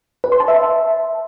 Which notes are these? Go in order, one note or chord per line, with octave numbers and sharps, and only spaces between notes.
B4
C6
A5
E5